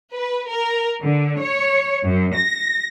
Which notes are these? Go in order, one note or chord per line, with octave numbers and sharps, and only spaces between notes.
B4
A#4
D3
C#5
F#2
A#6